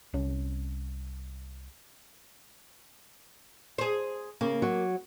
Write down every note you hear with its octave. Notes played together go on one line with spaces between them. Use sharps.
C2 C#4
G#4 C5
C#3 A#3
F#3